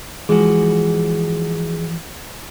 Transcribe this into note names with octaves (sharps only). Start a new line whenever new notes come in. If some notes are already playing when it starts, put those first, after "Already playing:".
E3 F3 G#3 F#4